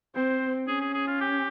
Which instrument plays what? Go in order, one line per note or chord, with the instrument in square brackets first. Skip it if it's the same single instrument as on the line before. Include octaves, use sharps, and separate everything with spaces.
[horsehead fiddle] C4 [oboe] C5
[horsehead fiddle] C#4 [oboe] G#4
[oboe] G#4
G#4
F4
G4